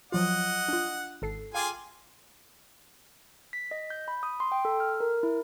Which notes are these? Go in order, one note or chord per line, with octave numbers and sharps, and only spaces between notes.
F3 F#3 F4 D#5 F#5
D4 F4
G#1 A4 C7
F4 G#4 F5 G5 G#5 D6
B6
D#5
G6
B5
D#6
C6
G5
A4
F6
A#4
E4